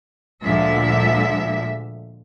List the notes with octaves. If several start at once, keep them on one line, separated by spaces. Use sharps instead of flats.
D2 A#2 D3 F3 G#3 E5